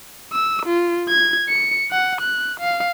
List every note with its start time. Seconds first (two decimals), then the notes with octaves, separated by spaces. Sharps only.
0.33 E6
0.66 F4
1.09 G#6
1.49 C#7
1.91 F#5
2.21 F#6
2.60 F5